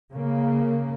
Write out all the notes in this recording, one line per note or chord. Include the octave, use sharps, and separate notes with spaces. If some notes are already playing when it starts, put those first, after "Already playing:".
C#3 A#3